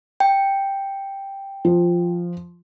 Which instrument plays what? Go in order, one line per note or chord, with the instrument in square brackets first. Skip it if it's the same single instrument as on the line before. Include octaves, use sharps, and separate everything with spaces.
[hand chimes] G5
[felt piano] F3